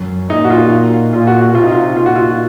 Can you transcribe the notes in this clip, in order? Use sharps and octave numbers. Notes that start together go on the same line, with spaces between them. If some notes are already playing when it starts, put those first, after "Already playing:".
Already playing: F#2
A#2 D#4
F#4
F4
A#2 F4
F#4
F#4
C3 F4
D#4
F4
A#2 F4
F#4
F4